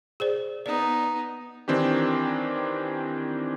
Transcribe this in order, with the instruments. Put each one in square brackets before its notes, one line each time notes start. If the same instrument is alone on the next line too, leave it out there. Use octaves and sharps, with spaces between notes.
[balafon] G#4 C5 D5
[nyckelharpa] B3 D#4 [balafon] D5
[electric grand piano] D#3 E3 C4 D4 G4